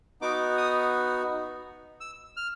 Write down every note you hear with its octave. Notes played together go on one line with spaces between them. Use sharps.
B3 D#4 F#4 D6
D#6
E6
F6